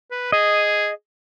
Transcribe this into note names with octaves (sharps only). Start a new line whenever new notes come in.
B4
G#4 D#5